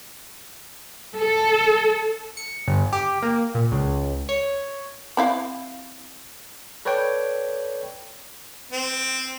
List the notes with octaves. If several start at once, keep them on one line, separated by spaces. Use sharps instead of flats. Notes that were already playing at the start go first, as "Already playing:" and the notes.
A4
C#7
G1
G4
A#3
A#2
C#2
C#5
C4 E4 F5
A4 B4 C#5 D5 G5
C4